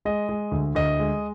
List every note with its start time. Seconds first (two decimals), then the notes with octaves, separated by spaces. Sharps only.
0.05 G#3 D#5
0.29 G#3
0.51 D2
0.75 D2 D#5
0.99 G#3